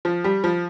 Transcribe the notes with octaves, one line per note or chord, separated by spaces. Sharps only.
F3
G3
F3